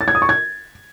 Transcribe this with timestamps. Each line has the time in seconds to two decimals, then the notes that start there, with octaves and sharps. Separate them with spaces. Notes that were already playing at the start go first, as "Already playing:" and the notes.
0.01 A6
0.08 G#6
0.15 D#6
0.22 C#6
0.29 G#6